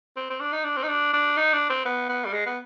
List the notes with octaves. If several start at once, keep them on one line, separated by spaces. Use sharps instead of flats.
C4
C4
D4
D#4
D4
C4
D#4
D4
D4
D#4
D4
C4
B3
B3
G3
G#3
B3